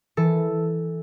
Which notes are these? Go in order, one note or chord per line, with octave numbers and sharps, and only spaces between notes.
E3 A4